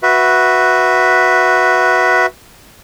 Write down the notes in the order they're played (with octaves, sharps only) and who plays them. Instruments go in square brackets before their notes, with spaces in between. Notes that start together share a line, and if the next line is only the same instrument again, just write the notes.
[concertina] F#4 B4 E5